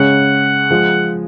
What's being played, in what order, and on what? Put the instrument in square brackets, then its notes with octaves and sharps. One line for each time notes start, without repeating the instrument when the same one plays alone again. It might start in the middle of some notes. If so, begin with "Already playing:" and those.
Already playing: [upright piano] C#3 G#3 C#4 [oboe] F#5
[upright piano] F3 G#3